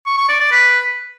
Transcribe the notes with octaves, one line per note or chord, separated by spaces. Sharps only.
C#6
C#6
D5
D5
B4